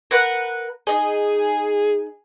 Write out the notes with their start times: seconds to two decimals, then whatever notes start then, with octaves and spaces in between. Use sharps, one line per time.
0.11 A#4 B4 F#5
0.87 D#4 G#4 D#5